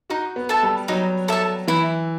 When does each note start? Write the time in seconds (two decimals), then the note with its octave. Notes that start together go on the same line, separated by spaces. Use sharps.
0.10 D#4 F#4
0.36 B3
0.49 A4 E5 A5
0.63 G3
0.88 F#3 D#4
1.28 A4 E5 A5
1.68 E3 E4